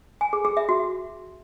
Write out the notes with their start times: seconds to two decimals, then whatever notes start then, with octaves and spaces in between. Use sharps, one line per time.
0.21 G#5
0.33 G#4
0.45 G#4
0.57 E5
0.69 F#4